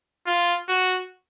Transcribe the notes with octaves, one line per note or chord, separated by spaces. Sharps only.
F4
F#4